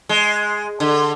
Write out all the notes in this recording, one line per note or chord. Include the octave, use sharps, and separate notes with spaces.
G#3
D3